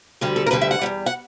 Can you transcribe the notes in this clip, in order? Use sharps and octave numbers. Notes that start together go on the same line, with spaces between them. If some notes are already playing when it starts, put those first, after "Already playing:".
D2 D3 G3 G4
A4
A#4
D2 D3 G3 B4
E5
F#5
E2 B2 G3
F#5